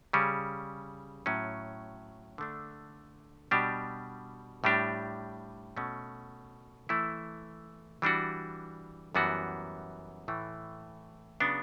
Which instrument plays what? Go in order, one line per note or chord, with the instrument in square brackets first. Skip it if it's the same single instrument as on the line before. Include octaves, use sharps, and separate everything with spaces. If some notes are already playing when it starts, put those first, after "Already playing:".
[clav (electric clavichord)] C#3 G3 C#4
A2 F#3 C#4
D3 A3 D4
B2 G3 D4 G4
A2 G3 D4 G4
B2 A3 C#4
E3 A3 E4
E3 G3 D4 F#4
F#2 E3 G3 B3 F#4
A2 E3 A3
C#3 F#3 B3 D4